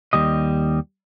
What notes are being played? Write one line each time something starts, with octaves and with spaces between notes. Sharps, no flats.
D#2 G3 D#5